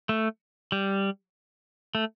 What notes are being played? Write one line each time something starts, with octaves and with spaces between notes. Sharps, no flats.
A3
G3
A3